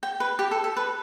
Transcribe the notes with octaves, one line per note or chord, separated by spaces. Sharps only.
G5
B4
G4
A4
A4
B4